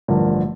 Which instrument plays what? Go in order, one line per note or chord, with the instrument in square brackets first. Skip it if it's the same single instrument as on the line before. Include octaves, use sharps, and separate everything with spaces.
[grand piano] A1 G2 D3 F3 A#4